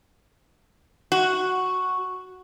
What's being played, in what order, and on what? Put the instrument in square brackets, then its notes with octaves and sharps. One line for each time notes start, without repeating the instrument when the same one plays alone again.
[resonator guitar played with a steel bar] F#4